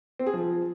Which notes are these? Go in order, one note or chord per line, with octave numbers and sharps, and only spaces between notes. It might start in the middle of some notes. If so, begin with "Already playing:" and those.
C4
G#4
F3